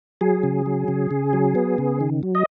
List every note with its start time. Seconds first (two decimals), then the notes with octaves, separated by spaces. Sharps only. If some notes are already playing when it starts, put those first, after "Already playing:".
0.21 F#3 G#4
0.43 C#3
0.66 F#3
0.88 C#3
1.11 C#3
1.33 F#3
1.55 B3
1.78 C#3
2.01 D#3
2.23 F#3
2.35 D#5